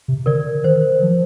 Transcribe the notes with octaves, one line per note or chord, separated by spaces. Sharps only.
C3
D3 A#4 D5
D#3 C5
F3